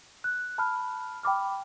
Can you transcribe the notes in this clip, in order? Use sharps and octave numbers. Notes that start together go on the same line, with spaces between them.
F#6
A5 B5 F6
G5 B5 D6 F6